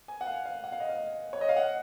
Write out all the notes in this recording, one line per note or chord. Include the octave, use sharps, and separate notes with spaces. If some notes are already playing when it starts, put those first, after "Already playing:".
G#5
F#5
F5
F5
F#5
F5
D#5
F5
C#5
D#5
F5
F#5